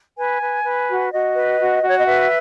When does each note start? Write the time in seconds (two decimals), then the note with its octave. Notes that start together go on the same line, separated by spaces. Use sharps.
0.18 B4 G#5
0.42 B4
0.66 B4
0.89 F#4
1.12 F#4 D#5
1.35 B4
1.60 F#4
1.83 F#4
1.89 C#5
1.97 D#5
2.06 B4 E5